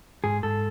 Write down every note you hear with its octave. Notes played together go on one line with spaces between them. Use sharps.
G#2 G#4
G#2 A4